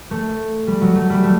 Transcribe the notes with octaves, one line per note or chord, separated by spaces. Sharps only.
A3
G3
F#3
A3
G3
A3